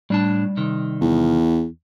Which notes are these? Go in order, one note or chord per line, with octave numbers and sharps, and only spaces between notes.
A2 G3 D4 A5
C3 D#3
E2